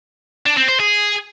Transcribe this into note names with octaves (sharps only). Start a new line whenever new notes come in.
D4
C4
C5
G#4